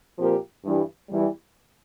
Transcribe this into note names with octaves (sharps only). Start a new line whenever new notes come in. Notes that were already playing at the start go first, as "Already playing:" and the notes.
A#2 F3 C4 G4 A#4
G2 E3 G3
E2 E3 G3